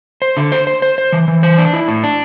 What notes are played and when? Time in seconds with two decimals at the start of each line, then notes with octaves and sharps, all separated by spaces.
0.22 C5
0.37 D3
0.52 C5
0.67 C5
0.82 C5
0.98 C5
1.12 E3
1.28 E3
1.43 C5
1.58 D4
1.73 E4
1.88 A2
2.04 D4